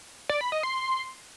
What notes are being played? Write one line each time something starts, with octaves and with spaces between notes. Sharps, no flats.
D5
B5
D#5
C6